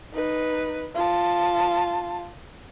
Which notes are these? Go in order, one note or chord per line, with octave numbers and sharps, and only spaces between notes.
D#4 B4
F4 A5